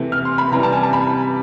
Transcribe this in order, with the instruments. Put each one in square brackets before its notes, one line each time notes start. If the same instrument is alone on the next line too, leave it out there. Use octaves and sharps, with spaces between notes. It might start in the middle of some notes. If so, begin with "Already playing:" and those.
Already playing: [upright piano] C3 E3 A3
F6
C6
B5
C3 E3 G3 A#5
A5
G#5
A5
B5